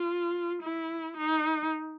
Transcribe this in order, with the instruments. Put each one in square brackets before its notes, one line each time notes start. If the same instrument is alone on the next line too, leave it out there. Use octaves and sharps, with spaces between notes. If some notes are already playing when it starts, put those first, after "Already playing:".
Already playing: [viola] F4
E4
D#4